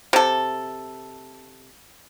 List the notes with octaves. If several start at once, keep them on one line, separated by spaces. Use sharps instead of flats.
C3 A4